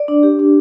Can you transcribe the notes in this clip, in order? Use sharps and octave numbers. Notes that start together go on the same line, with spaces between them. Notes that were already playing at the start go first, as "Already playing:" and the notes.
Already playing: D5
D4
G4
D4